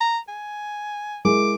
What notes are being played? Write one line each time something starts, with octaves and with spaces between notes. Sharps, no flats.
A#5
G#5
G#3 E4 A#4 D6